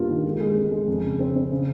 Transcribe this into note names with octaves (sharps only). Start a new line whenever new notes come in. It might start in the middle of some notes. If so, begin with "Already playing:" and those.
Already playing: G2 A#3 F4
D#3
G#3
G#3
C4
G#3
F2
C#3
C4
C4
C#3